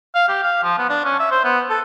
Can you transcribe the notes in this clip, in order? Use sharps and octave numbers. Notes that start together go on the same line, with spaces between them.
F5
G4
F5
F3
B3
D4
C#4
E5
C5
B3
A4